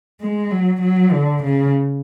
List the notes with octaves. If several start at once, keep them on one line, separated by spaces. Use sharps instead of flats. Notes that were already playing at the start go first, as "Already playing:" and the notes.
G#3
F#3
F#3
D3
C#3